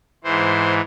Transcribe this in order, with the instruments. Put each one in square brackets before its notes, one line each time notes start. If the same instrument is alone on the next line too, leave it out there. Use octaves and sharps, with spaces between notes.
[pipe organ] G#2 E3 C5